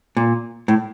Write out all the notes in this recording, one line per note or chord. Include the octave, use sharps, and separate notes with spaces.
A#2
A2